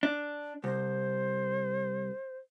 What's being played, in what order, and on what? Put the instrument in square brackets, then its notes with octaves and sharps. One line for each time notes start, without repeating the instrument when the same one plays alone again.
[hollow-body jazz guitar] D4
[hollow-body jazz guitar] C2 [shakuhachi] C5